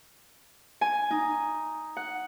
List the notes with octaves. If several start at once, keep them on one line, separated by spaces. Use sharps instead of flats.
G#5
D#4
F#5